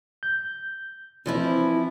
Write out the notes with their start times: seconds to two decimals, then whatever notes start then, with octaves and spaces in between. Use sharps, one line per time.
0.23 G6
1.26 E3 F3 C4 E4